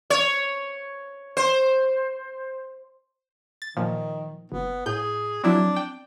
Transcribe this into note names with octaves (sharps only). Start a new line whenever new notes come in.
C#5
C5
A6
A#2 D#3 F3
F#1 B3
A2 G#4 G6
F3 F#3 C4 D4 E4
G5